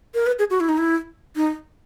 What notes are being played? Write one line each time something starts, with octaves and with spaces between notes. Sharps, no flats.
A#4
B4
G#4
F#4
E4
D#4
E4
D#4